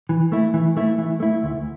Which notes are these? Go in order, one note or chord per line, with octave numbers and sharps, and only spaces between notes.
E3
A3 E4
E3
A3 E4
E3
A3 E4
D2